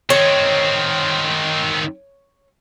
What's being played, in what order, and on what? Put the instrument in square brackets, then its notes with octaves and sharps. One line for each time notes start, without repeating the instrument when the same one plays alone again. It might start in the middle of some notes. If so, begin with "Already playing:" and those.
[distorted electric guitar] D#3 C4 [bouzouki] C#5